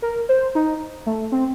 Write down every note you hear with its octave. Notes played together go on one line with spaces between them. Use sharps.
A#4
C5
D#4
A3
C4